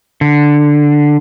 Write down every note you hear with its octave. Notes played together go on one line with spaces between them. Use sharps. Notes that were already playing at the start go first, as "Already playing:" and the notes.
D3